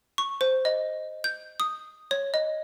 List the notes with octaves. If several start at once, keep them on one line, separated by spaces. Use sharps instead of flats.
C#6
C5
D#5
G6
D#6
C#5
D#5